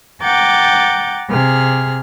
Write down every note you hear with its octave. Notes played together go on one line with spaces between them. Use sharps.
F#5 G5 A#5 D6 G6 A6
C3 G#4 F6